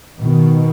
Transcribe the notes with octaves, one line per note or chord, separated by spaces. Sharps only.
B2 D#3